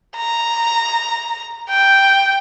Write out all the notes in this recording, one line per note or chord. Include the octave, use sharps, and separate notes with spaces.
A#5
G5